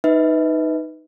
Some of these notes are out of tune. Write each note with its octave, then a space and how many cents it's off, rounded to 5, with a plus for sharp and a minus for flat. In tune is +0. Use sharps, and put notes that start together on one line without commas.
D#4 +0 B4 +5 E5 -35